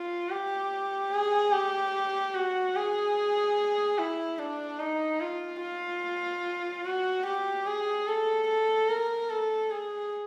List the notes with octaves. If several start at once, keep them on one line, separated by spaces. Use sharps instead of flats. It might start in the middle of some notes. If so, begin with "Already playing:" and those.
Already playing: F4
G4
G#4
G4
F#4
G#4
E4
D4
D#4
F4
F4
F#4
G4
G#4
A4
A4
A#4
A4
G#4